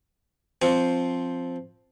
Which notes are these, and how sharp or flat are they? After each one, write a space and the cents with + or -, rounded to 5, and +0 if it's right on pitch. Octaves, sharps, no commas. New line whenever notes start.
F3 +0 C4 +0 C#6 +25